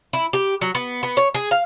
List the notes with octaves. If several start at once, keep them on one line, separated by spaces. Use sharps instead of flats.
E4
G4
F#3
B3
B3
C#5
G#4
F5